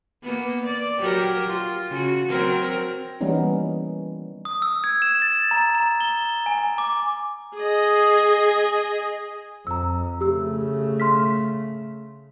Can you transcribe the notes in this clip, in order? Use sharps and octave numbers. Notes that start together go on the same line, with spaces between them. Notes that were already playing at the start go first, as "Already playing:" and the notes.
A#3 B3
D5
F#3 G4 A#4
F4
C#3 F#4
F#3 C4 A#4
E3 G3 A#3 B3 C#4 D#4
D#6
E6
G#6
E7
A6
A#5
A#5
G7
G#5
G#5
D6
G#4 D#5
F2 A#5 E6
C#3 A3 G4 E6
C6 F6 B6